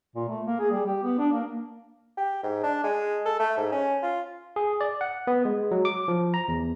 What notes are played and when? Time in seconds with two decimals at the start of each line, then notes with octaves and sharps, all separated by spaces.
0.16 A#2
0.29 A3
0.47 A#3
0.60 G#4
0.71 G3
0.86 G4
1.03 B3
1.19 D4
1.32 A#3
2.17 G4
2.43 G#2
2.63 D4
2.84 G#3
3.25 A4
3.40 A3
3.57 G#2
3.72 C#4
4.03 F4
4.56 G#4
4.81 D5
5.01 F#5
5.27 B3
5.45 G#3
5.71 F#3
5.85 D6
6.08 F3
6.34 A#5
6.48 E2